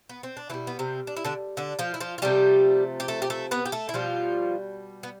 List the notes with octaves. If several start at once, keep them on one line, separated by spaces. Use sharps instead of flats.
B3
C4
D4
B2 E3 G3 E4
B3
C3 C4
D4
E4
D3 D4
D3 D4
F3 F4
E4
F3 F4
F4
C3 F3 G3 A3 G4
G4
A3 A4
G4
A3 A4
B3 B4
G4
A3 A4
E4
B2 F3 G3 F4
B3